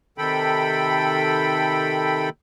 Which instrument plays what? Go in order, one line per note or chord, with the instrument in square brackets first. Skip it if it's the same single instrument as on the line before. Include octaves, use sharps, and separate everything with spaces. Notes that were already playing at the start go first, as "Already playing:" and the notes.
[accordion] C3 D#3 A4 G5 B5